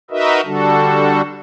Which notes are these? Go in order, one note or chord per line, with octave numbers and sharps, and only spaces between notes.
D#4 F#4 A#4 B4 D#5 E5
D3 G3 D4 F#4 A4